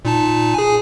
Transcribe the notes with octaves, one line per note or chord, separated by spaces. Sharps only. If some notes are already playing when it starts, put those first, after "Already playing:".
A#2 D#4 A5
G#4 G#5